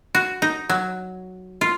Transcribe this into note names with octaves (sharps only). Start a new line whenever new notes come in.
F#4
D#4
F#3
F4